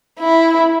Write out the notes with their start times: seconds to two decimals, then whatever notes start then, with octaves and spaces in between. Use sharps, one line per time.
0.19 E4